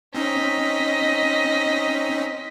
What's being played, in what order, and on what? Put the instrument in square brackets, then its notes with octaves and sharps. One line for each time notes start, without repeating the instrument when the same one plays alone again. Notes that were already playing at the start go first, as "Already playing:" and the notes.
[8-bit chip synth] C4 C#4 D#4 [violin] D#5 B6